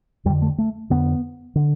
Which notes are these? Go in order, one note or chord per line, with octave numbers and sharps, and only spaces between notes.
F2 D3 G3
A3
A3
F2 D3 B3
D3